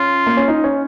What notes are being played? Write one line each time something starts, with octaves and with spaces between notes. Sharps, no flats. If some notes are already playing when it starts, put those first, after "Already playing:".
Already playing: C#4 F4
A#3
C#4
D#4
C#4